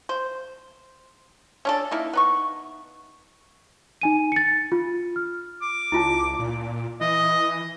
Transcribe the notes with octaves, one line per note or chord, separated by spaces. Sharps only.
C5
C#4 D4 A4
A#3 D#4 E4
B3 D#4 C#6
D#4 G#5 D#7
A6 C#7
F4
F6
D6
C#2 E4 F4 A5
A#2
E3 D#5